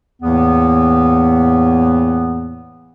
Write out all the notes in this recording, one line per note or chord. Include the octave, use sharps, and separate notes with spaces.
E2 A2 E3 A#3 B3